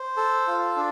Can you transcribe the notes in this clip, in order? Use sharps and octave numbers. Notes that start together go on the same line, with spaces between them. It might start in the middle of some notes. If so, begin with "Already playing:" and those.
Already playing: C5
A4
F4
D4